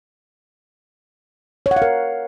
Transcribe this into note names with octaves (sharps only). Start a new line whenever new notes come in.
C#5
F#5
F5
A#4